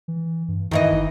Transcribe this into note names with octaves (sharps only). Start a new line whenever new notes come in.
E3
G2
F#2 D#3 E3 D#5
G1